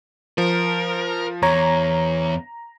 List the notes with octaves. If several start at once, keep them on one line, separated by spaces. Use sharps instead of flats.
F3 A#4
E2 C#5 A#5